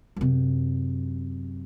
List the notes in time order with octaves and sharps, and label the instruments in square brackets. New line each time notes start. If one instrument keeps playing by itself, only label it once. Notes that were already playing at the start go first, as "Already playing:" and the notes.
[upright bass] F#2 C3